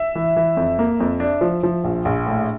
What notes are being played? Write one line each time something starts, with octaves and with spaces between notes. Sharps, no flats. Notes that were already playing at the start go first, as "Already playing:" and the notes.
Already playing: E5
E3
E3
F2
A#3
F2
D4
F3
F3
A#1
A#1
A2